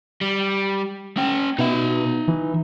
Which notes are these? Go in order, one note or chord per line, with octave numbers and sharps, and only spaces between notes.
G3
C#4 G5
B2 D#4 E5
E3